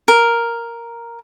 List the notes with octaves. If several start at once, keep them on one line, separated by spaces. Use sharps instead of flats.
A#4